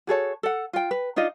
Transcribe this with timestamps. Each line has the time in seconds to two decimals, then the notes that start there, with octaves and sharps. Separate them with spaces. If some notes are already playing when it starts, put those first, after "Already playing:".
0.07 F#4 G#4 A4 C#5
0.43 A4 F#5
0.73 F4 G5
0.91 B4
1.16 D4 D#4 F4 D#5